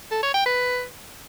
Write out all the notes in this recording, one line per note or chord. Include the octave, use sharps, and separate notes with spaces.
A4
C#5
G5
B4